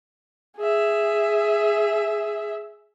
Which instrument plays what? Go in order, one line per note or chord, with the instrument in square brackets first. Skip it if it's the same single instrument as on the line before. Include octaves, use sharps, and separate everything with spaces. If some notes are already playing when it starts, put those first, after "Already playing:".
[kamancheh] G#4 E5